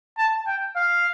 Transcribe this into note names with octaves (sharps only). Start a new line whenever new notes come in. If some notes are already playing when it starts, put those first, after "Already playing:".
A5
G5
F5